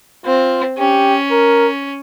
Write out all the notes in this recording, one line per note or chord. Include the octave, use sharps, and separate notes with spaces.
C4 F4
C#4 G4
A#4